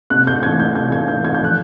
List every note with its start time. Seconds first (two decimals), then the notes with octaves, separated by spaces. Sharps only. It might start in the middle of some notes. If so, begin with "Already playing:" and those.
0.10 C3 F#6
0.27 G6
0.43 E3 A3 C4 G#6
0.60 G6
0.75 C3 G6
0.92 G#6
1.08 E3 A3 C4 G6
1.25 G#6
1.34 G6
1.41 F3 F#6